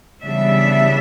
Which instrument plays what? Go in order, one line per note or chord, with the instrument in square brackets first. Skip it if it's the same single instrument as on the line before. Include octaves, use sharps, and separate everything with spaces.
[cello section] C#3 E3 G3 B3 D4 E5